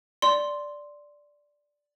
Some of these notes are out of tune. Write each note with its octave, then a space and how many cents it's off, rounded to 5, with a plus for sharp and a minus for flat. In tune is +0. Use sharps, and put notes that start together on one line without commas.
D5 +0 C6 +0